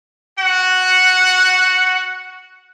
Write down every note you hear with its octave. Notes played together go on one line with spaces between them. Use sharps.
F#4 F#5